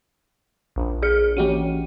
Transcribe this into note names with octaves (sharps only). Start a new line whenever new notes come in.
A#1
G#4 F6 C#7
E3 C#4 F#4 G4 D#7